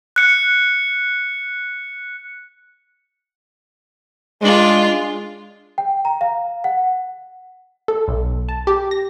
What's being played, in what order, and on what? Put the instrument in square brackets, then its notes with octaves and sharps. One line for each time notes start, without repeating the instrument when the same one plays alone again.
[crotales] F#6 C#7
[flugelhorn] G#3 [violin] D4 F4
[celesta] G5
A#5
F5
F#5
[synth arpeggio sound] A4
B1
A5
G4
A#6